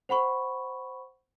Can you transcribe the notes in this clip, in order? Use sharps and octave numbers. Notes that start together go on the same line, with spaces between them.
C5 F#5 B5 C#6